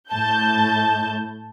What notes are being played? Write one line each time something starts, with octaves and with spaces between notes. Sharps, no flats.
A2 A5 G6